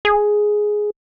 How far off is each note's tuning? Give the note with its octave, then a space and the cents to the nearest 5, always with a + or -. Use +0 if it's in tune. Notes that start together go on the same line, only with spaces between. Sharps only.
G#4 +5